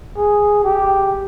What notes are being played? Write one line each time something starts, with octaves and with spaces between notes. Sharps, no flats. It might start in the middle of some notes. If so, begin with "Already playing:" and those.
G#4
G4